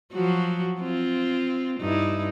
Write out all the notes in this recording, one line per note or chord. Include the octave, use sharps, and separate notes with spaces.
F3 F#3 F#4
C4 F4
G2 D#4 E4